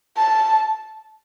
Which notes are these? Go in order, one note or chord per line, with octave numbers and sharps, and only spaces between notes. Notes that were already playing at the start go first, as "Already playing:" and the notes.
A5